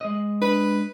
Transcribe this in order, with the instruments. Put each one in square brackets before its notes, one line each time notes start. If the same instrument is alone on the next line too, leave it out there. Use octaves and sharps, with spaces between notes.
[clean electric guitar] G#3 D#5
[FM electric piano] D4 [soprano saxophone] B4